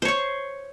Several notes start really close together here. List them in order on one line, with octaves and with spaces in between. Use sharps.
C5 C#5 C#6